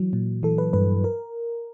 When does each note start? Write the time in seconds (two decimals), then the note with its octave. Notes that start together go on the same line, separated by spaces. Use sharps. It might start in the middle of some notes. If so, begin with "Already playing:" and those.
Already playing: E3 F#3
0.13 A#2
0.43 E3 A4
0.58 B4
0.73 G2 B4
1.04 A#4